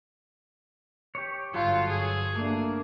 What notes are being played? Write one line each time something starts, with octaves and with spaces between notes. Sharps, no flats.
G4 C#5
G1 F#3 F4 A4 C#5
G#4
A3 A#3 D4